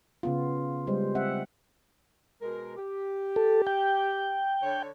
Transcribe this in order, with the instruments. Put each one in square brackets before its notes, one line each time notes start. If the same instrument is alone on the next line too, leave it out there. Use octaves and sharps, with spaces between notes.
[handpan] C#3 B3 F4
G3 G#3 C5
C4 E5 F#5
[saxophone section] B2 G#3 A#4
G4
[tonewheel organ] A4
G5
[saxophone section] D3 C#5